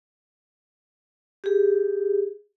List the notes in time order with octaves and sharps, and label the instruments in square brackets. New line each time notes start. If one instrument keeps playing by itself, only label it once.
[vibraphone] G4 G#4